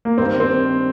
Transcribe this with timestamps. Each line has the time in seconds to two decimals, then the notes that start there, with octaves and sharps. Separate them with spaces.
0.05 A#3
0.18 G2 D#3 C4
0.40 C4